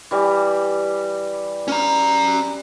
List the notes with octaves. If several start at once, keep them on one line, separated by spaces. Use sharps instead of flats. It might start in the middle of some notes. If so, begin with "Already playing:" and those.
E3 G3 D6
C#4 A#5